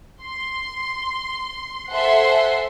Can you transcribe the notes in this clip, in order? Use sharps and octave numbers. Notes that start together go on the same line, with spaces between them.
C6
A4 C5 E5 F#5 G#5 C6